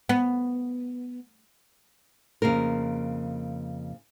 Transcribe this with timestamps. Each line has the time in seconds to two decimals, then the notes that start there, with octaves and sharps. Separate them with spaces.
0.09 B3
2.42 F2 C#3 A#3 A#4